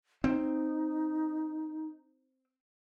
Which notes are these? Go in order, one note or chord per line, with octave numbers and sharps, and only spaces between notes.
C4 D#4